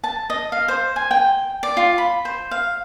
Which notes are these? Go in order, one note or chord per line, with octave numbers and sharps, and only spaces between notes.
A5
D#5
F5
C5
G#5
G5
D5
F4
B5
C5
F5